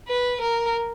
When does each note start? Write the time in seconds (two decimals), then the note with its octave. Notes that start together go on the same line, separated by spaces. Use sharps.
0.08 B4
0.41 A#4